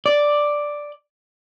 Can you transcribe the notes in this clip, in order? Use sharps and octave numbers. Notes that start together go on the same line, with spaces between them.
D5